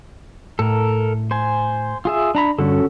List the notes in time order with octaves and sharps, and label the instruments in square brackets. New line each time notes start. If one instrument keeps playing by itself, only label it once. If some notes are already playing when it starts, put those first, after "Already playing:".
[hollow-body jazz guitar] A2 [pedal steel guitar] A4 A#4
[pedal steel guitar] C5 G#5
F4 G#4 E5
D4 A#5 B5
[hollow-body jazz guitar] G2 D3 [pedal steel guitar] C#4 F#4 A4